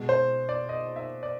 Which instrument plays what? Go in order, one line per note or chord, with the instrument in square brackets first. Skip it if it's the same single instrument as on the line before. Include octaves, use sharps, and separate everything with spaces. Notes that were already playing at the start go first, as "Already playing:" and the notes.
Already playing: [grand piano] B2 G#3
C5
D5
D#5
E5
D5